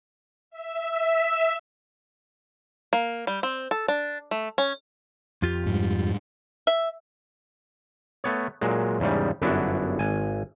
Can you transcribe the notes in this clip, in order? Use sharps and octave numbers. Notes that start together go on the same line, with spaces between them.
E5
A#3
G3
C4
A4
D4
A3
C#4
F2 F4 G4
G#2 G3
E5
A3 B3 C#5
A#2 F#3 G#3
E2 G#2 C#3 G3
G1 F#2 B3 D4 E4 F#4
G#1 G#5